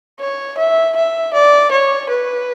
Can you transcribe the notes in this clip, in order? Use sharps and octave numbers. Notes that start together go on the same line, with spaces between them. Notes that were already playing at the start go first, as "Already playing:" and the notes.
C#5
E5
E5
D5
C#5
B4